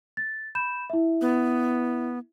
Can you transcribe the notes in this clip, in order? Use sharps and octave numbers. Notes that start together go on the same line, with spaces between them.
A6
B5 G6 E7
E4 E5
B3